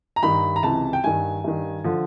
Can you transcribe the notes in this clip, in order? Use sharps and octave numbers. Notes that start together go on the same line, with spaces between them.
A#5
G2 D#3 B5
A#5
C#2 C3 E3 A5
G5
G2 D#3 G#5
G2 D#3
D3 F3